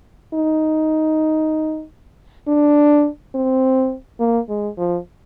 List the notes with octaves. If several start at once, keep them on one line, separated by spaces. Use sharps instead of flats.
D#4
D4
C4
A#3
G#3
F3